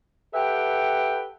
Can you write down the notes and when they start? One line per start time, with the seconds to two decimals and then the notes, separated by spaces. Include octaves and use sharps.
0.34 G4 A4 B4 E5 F#5 G5